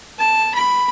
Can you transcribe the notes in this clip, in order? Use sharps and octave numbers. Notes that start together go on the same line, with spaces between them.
A5
B5